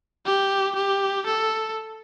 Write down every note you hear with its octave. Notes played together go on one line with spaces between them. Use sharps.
G4
G4
A4